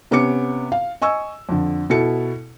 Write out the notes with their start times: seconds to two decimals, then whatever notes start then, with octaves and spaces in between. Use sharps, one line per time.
0.11 C3 B3 C#4 D6 C#7
0.72 F5
1.02 D#5 G#5 C#6 E6
1.49 F2 D3
1.90 B2 E4 A4 C#7